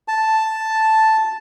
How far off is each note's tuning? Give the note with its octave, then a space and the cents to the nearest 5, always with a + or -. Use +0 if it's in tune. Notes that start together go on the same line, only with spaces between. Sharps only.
A5 +0